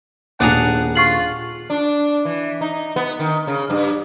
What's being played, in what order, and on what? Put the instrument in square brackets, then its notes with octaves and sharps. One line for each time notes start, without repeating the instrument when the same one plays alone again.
[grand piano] D#1 D#2 [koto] D4 G#4 A#5 [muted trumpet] F#5
[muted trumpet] F4 [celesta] C#6 C7 F#7
[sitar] D4
E3
D#4
B3
D#3
C#3
G2